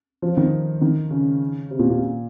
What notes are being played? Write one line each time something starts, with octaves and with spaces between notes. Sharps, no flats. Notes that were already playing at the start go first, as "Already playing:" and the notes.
F3
D#3
D#3
C#3
C3
A#2
A#2